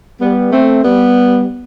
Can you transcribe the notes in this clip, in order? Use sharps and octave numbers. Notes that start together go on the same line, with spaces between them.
G3 B3
A3 C4
G3 B3